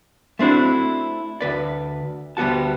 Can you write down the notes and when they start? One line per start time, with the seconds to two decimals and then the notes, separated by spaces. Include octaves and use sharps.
0.39 A3 C4 D4 E4 F#4
1.41 D2 B4 D5
2.37 D2 G3 B3 F#4 A5